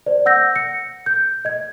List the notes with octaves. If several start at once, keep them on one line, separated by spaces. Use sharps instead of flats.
C5 D5
F#5 E6 G6 A#6
C#7
G6
D#5 G#6